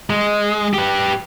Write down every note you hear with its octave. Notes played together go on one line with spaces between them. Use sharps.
G#3
G4 B4